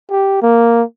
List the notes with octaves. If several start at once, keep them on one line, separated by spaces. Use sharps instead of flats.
G4
A#3